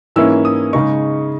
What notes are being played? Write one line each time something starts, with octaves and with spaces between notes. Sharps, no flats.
G#2 E3 A#3 C#4 E4 E6
D#6
C#3 G#3 D#4 C#6